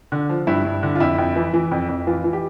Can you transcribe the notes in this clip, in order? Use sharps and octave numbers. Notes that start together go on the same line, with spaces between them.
D3
F3
G2 E4
G2
D3
F4
F2 E4
F2
E3
E3
F2
F2
E3 F4
E3
G4